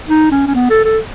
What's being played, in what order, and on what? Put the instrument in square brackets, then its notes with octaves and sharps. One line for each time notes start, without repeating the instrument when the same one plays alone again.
[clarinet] D#4
C#4
C#4
B3
A4
A4